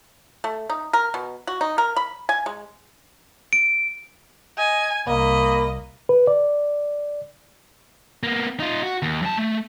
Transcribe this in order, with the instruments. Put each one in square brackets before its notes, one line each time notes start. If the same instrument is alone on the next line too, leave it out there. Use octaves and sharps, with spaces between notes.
[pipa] A3
D#4
A#4
B2
F#4
D#4
A#4
B5
G#5
G#3
[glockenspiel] D7
[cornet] D#5 [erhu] G#5
[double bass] C2 [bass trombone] A#3 [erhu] D#5 [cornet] B5
[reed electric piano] B4
D5
[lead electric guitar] A#3 B3
D#4 F4
F#4
D#2
F#2 A5
A3